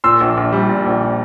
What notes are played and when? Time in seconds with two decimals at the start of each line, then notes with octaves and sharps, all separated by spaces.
0.04 A#2 C6 E6
0.21 A#1
0.37 A#1
0.53 G3
0.69 A#2
0.86 A#1